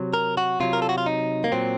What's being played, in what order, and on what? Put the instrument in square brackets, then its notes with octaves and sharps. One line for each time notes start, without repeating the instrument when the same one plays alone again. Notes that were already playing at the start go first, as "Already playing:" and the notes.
Already playing: [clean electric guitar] C3 F#3
A#4
F#4
C3 F#3 F4
A#4
A4
F#4
F4
D#4
A#3
A#2 F#3 C4